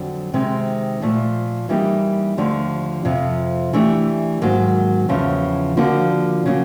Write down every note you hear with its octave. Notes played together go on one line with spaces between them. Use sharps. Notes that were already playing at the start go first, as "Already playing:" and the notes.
Already playing: F2 D3 F#3
C3 D#3 G#3 C4
A#2 F3 A3
E3 G3 A#3 D#4 G4
D#2 D3 F3 A3 D4
F2 C3 F3
E3 A3 D4 G4
G#2 D#3 F#3 A#3
E2 C#3 F3
D3 F3 A#3 D4 F#4
C#3 F#3 A#3